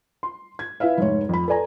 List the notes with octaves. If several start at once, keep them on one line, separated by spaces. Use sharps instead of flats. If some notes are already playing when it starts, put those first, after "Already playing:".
C6
G#6
E4 B4 E5 F5
F1 G#2 C#5
F2 B5
A4 B4 D5 G#5 A#5